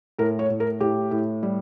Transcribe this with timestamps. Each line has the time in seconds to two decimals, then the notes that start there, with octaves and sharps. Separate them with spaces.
0.19 A2 A#4
0.39 C#5
0.50 A2
0.60 A#4
0.80 A2 G4
1.11 A2
1.43 G3